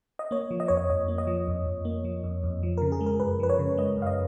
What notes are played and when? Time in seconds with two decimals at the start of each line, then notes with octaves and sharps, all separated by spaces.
0.19 D#5
0.31 A#3 C#5
0.51 F3
0.60 D#5
0.68 F2 C#5
0.77 D#5
0.90 F2 D#5
1.08 A#3
1.18 D#5
1.27 F3
1.48 F2
1.66 F2
1.85 A#3
2.05 F3
2.24 F2
2.44 F2
2.63 F3
2.77 C#3 A#4
2.92 G#4
3.01 G#3
3.06 A#4
3.20 F#2 B4
3.40 F3 B4
3.50 C#5
3.59 C#3
3.77 G#3 D#5
3.97 F#2
4.02 F5
4.06 D#5